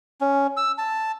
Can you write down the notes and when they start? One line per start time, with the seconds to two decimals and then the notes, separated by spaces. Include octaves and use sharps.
0.21 C#4
0.57 E6
0.78 A5